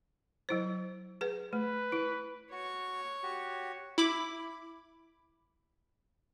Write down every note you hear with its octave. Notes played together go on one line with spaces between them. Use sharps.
F#3 E4 C5
G#4 B4
A3 B4
E4
F#4 C#5 C#6
F#4 G4
E4 B5 D6